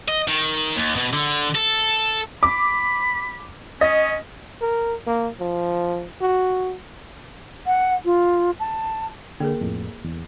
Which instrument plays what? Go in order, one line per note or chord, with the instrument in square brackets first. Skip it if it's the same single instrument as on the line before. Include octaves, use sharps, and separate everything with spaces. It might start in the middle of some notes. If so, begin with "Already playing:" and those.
[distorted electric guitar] D#5
D#3
D#2
B2
D3
A4
[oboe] B5 [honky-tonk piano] D6
[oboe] C#4 [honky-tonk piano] D#5
[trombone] A#4
A#3
F3
F#4
[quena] F#5
F4
A5
[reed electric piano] D3 [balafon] A#3 G#4 A#4
[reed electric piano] F2 A2
E2